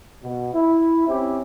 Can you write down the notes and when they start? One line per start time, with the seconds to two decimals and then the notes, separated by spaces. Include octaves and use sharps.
0.22 B2
0.53 E4
1.08 C4 C#4 E4 G4